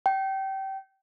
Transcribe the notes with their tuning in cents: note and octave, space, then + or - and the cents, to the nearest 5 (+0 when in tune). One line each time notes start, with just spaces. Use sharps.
G5 -25